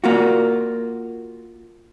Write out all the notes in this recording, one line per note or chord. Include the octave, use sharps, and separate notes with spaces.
A#3 F4 F#4